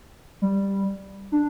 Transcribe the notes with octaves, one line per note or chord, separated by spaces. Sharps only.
G3
D4